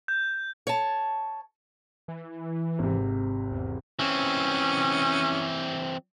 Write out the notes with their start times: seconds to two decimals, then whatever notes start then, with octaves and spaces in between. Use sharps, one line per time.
0.08 G6
0.67 C#5 A5
2.08 E3
2.79 G#1 C3
3.52 E2
3.99 E3 C4 C#4